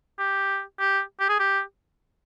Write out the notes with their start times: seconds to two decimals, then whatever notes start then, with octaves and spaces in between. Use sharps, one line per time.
0.19 G4
0.79 G4
1.20 G4
1.29 G#4
1.39 G4